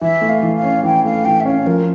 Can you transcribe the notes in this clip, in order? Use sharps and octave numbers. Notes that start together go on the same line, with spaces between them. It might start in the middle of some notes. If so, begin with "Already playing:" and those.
E3 E5
A3
F5
E3
F5
C#4
E3 G5
A3 F5
E3 G5
E5
C#4 F5
F3 A#4